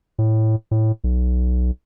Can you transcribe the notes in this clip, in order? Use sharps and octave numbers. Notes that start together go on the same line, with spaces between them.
A2
A2
B1